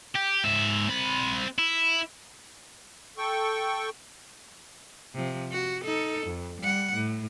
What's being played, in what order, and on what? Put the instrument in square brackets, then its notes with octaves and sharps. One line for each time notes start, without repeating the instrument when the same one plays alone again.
[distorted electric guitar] G4
G#2 E5
C4 B5
E4
[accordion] A4 G5 C#6
[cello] C3 F3
F#4
D#4 A4
F2
G3 F#5
A2